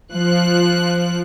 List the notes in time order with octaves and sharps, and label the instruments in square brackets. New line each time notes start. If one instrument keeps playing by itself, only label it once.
[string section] F3 F#6